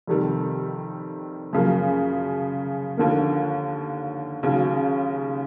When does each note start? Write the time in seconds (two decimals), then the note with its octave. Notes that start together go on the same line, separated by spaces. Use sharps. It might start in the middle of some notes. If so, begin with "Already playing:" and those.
0.07 F2 C3 D#3 G3
1.53 F#2 C#3 F3 A#3
2.97 D#2 D3 F3 A#3
4.43 D#2 C#3 F#3